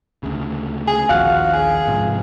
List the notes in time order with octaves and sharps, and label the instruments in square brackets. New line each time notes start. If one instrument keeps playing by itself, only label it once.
[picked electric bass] D2 C#3
[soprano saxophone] G#4
[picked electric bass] A#1 D#2 F3 [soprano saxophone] F#4 [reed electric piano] F5 F6 F#6
[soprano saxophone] G#4
[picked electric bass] G#2 C3 F3